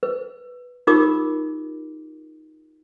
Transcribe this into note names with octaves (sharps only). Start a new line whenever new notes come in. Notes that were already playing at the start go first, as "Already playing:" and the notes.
B4
D#4 F4 G4 A#4 D6 D#6